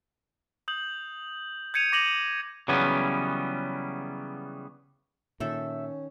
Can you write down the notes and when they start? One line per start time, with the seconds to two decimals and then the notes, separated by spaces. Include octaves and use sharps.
0.68 D#6 G6 F#7
1.74 G6 G#6 C#7 D#7 F7
1.93 D6 A#6 D#7 F7 F#7
2.68 C#3 E3 F#3 G3 B3 C#4
5.40 A#2 D#3 C#4 A4 E5